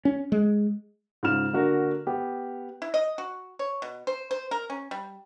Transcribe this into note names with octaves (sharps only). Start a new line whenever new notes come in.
C#4
G#3
G#2 C#3 F4 F6 E7
D3 A#3 F#4 A#4
B3 G4
E4
D#5
F#4
C#5
B2
C5
C5
A#4
C#4
G3